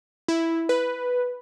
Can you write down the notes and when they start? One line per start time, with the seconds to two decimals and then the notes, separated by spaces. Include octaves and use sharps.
0.28 E4
0.69 B4